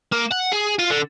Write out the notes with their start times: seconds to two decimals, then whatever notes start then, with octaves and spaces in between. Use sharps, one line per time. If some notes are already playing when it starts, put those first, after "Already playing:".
0.13 A#3
0.32 F#5
0.53 G#4
0.79 F4
0.91 D3